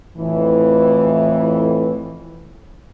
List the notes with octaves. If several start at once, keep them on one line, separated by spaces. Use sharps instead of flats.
F2 A2 E3